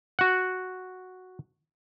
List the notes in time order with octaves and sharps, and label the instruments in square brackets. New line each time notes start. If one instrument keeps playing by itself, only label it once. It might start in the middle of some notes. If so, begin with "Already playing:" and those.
[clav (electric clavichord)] F#4 F#5